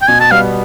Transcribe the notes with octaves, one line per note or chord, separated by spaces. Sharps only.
G5
B2 G#5
A5
G3 B3 F5